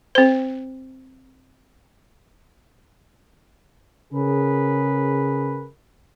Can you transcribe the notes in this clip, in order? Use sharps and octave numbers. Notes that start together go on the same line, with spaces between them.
C4 C5
C#3 G#4 A#4 B4